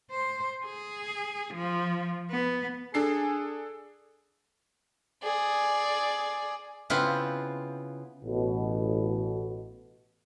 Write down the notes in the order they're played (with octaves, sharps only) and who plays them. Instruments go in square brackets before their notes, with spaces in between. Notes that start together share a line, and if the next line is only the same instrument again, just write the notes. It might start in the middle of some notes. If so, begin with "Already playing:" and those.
[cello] C5
G#4
F3
B3
[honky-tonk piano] D4 A4 C7 [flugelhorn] G#4
[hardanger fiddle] G#4 D5
[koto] C#3 B3 C4 E4 F4
[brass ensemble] A1 B2